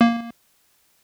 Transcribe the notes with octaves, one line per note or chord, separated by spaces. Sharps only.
A#3